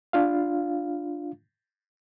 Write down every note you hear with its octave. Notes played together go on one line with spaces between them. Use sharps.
D4 F4 F5